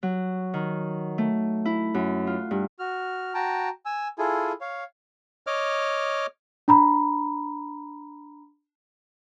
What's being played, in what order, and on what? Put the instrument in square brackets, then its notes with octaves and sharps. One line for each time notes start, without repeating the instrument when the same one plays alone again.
[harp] F#3
D#3
A3
E4
F#2
F4
G2
[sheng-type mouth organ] F#4 F6
F#4 G5 A5 A#5
G#5 E6
E4 F4 G#4 A4 G#5
C#5 F5
[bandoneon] C#5 D#5 D6 F6
[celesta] D4 A#5 B5